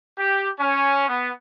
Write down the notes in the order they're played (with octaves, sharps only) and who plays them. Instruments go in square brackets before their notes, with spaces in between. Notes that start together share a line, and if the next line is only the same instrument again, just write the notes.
[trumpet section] G4
C#4
B3